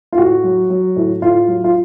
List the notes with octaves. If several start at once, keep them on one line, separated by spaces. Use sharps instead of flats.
F4
A2 F#4
F#3
F#3
A2
A2 F4
F#3
F4